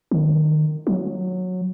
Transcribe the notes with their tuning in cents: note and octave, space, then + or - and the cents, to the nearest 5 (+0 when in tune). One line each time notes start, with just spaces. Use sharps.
D#3 -25
F#3 -15